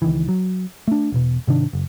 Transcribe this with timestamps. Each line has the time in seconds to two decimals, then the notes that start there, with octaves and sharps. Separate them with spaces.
0.02 C#2 D#3 E3
0.29 F#3
0.88 A3 D4
1.12 E1 B2
1.47 G#2 C3 D#3 D4
1.73 F#1